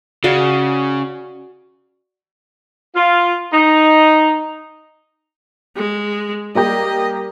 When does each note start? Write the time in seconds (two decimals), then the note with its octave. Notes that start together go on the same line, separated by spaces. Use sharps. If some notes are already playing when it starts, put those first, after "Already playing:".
0.24 C#3 F#4 D5 F5
2.95 F4
3.53 D#4
5.76 G#3
6.55 G3 A#3 G4 D#5